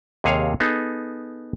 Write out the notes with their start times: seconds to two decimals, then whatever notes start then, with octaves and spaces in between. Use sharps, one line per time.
0.24 D#2 C3 G#4 C#5 F5
0.60 B3 D#4 G#4 A4